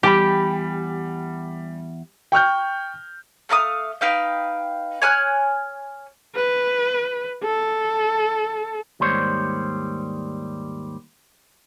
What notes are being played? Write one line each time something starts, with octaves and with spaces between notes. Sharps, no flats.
E2 G3 G4 G5 B5
G5 C#6 F6 G6
A3 F5 A#5 D#6
D#4 B4 F5 G5
C#5 G#5 F6 F#6
B4
A4
D#2 G#2 G3 C5 C#5